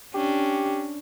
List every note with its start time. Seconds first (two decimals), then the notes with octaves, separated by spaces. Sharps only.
0.14 C#4 D4 G4